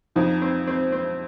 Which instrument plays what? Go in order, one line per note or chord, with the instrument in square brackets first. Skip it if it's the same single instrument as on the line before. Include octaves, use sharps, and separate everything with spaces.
[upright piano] F2 F3 [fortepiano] D#4
[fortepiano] C4
C4
C4